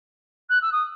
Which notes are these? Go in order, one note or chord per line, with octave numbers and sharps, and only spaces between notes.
F#6
E6
D#6